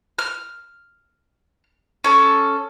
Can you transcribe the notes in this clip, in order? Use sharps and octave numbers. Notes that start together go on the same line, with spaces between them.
F6
C#4 A4